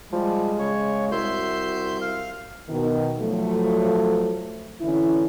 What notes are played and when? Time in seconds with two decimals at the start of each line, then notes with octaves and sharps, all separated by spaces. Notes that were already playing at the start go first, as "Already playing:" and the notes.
0.12 F3 G3 G#3
0.59 C#3 C#5
1.12 C2 F#4 E5 C6 G6
2.01 F5 F6
2.69 B2 D#3
3.19 F3 F#3 A3
4.81 D3 E3 C#4 E4